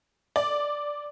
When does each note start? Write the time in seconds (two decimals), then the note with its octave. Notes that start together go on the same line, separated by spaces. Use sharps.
0.36 D5